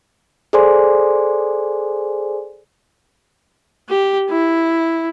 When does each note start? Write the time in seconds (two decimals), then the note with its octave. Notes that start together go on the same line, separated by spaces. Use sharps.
0.53 G#4 A4 C5 D5 G#5 C6
3.89 G4
4.30 E4